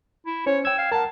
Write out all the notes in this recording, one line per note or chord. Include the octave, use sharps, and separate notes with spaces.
E4
C#4 C5 C#5
G5 E6 G#6
F5
A#4 F#5 A5